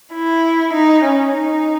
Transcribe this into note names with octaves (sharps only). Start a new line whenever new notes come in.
E4
D#4
C#4
D#4